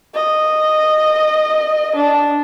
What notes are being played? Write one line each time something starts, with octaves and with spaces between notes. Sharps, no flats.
D#5
D4